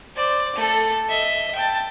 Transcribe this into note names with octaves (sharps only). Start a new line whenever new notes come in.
C5 D5
A3 A4
D#5 E5
G5 A5